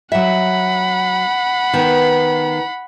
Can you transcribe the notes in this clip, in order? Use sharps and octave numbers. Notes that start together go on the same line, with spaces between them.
F#3 E5 F#5 B5
D#3 B3